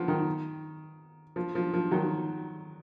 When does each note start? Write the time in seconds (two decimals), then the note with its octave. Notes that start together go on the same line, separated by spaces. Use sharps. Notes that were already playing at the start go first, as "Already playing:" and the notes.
Already playing: F3 B3
0.08 D#3
1.36 F3
1.55 F3
1.74 F3
1.91 D#3 F#3